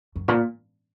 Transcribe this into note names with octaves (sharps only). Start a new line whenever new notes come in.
F#2
A#2